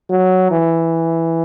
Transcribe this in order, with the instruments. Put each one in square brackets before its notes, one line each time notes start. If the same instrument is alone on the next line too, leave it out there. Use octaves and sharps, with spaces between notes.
[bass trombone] F#3
E3